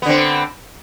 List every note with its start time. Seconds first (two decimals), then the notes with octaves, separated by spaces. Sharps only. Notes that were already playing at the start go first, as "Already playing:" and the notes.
0.02 B3
0.06 D3
0.09 C4